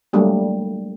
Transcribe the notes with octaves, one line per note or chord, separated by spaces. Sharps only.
F#3 G3 A3 A#3 D4